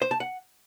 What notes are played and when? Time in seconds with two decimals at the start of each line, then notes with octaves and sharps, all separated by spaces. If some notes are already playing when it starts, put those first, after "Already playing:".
0.02 C5
0.11 A5
0.20 F#5